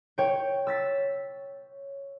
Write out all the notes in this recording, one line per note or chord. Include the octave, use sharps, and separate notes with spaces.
C#5 G5
E6 A6 B6